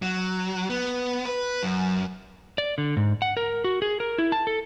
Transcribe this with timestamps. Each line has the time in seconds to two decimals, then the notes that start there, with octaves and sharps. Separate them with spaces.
0.02 F#3
0.70 B3
1.25 B4
1.63 F#2
2.58 D5
2.78 D3
2.97 G#2
3.22 F#5
3.37 A#4
3.64 F#4
3.82 G#4
4.00 A#4
4.18 E4
4.32 A5
4.47 A4